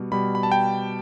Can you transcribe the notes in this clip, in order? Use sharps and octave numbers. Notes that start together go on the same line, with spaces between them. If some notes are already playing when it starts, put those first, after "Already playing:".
Already playing: B2 G3
B2 G3 B5
B5
A5
G5